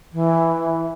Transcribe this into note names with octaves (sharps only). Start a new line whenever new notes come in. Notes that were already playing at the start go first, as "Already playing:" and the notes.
E3